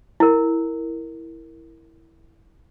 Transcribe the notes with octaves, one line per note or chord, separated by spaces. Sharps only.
E4 A#4